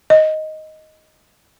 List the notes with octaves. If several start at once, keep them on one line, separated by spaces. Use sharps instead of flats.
D#5